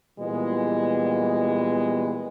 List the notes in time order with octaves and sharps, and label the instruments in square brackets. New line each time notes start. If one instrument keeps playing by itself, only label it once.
[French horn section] A#2 E3 G3 G#3 B3